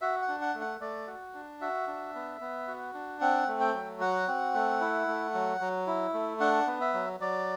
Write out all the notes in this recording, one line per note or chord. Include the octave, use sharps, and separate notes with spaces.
F#4 E5
F#5
D4
F#5
A3
F#5
A3 D5
F#4
D4
F#4 E5
D4
B3
B3
F#4
D4
C4 F#5
A3
G5
F#3
F#4 F#5
C4
A3
E4
A3
F#3
F#3
E4
A3
D4 F#5
B3
E5
F#3
F#3 D5